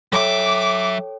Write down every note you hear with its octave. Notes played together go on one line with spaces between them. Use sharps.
F#3 A4 C#5 E5 G5 D6